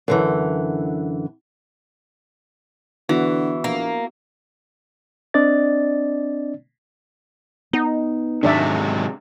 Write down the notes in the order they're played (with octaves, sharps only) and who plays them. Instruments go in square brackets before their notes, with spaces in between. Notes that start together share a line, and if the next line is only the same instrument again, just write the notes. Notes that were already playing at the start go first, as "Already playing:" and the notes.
[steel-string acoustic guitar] F#2 D3 E3
[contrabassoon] D3 [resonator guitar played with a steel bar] E3 [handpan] B3 F#4
[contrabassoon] A#1 [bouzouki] A#3
[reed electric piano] C4 D4 D5 D#5 A6
[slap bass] B3 [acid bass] D#4
[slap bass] G#2 D#3 [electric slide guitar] C3 F#3 G#3 [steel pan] D4 D5 E5